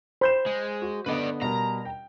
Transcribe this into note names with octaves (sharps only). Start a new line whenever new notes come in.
C5 B5 G6 E7
G#3
F#4
D3 B3 B4 D5 D#5
B2 G3 A#4 A#5
G5